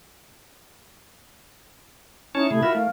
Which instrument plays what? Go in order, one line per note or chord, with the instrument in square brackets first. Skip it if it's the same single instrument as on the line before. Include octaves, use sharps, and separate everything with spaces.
[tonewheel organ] C#4 C#5 A5 [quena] D#4 [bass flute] E4
[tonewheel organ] C3 G#4 [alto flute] A3 [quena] B5
[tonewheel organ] F4 F#4 E5 [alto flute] A#4
[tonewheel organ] A3 [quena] F5